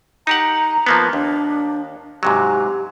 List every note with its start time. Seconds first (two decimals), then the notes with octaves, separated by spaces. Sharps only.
0.27 D#4 G4 F#5 A#5
0.86 F3 A#3 B3
1.13 D#2 D4
2.23 G#2 C3 F#3 G4